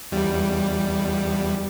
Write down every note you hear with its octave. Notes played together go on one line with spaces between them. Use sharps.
E2 G3